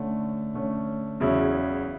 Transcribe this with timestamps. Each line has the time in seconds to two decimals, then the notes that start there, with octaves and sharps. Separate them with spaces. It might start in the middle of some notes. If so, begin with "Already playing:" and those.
Already playing: D3 A3 C#4
0.54 D3 A3 C#4
1.20 E2 C#3 F#3 C#4 E4